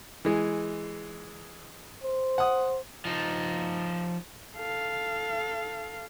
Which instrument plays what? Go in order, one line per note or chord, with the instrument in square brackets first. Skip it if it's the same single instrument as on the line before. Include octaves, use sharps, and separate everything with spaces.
[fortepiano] E3 G#3
[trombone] C5
[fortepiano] F#5 D#6
[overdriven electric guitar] F3 D#4
[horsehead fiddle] A4 F5